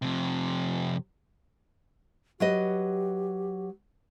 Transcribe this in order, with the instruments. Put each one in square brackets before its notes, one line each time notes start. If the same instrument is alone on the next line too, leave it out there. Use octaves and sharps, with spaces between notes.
[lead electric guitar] F2 C3
[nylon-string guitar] F#3 B4 D#5 [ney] G4